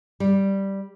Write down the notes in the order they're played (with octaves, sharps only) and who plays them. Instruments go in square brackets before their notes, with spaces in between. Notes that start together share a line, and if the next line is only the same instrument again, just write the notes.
[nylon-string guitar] G3